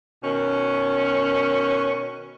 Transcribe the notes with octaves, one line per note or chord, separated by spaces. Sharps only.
B2 D#3 C#4